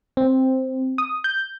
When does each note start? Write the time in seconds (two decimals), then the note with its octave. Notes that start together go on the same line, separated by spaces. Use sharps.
0.17 C4
0.98 D#6
1.24 G6